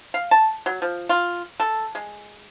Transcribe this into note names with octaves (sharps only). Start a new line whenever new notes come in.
F5
A5
F#3
F3
F4
A4
G#3